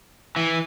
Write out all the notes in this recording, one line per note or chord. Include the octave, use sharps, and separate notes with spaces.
E3